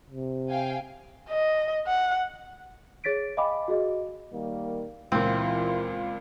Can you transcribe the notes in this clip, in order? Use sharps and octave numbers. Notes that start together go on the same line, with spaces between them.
C3
F5 G5 G#5
D#5
F#5
G#4 C#5 A6 B6 D7
D#5 F5 G5 G#5 B5 D6
F#4 G#4 D#5
D#3 G3 A#3
C#2 A#2 E3 C4 F4